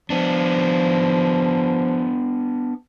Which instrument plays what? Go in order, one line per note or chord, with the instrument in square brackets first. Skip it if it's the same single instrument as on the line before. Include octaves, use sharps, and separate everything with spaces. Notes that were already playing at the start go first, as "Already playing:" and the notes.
[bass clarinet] F3 [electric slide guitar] B3 D4